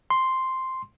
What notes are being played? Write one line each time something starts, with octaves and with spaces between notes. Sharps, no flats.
C6